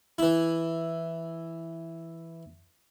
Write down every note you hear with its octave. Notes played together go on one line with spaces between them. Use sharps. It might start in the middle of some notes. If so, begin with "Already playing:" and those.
E3 E4